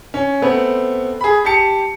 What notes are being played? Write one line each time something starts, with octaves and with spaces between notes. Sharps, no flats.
C#4
A3 B3 C4
G#4 B5
G4 A5 C#7